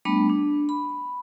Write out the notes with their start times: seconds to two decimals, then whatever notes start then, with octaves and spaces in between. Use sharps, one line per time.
0.05 G3 A3 B3 D4 B5
0.29 D4
0.69 B5